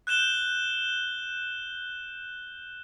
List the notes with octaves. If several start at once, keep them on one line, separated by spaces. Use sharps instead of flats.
F#6 G6 E7 G7